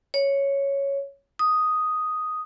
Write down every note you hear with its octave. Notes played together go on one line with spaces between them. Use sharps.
C#5
D#6